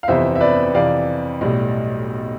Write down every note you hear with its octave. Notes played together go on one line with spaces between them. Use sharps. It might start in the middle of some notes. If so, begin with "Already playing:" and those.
F5
G1 F2 C3 E3 B3 C5 E5
E5
B4 D5
F2 C3 E3 D5 F5
B1 A2 G3